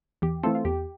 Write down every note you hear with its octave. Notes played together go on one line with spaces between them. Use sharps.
E2 G4
E3 A3 C4 F4 A4
F4
E2 G4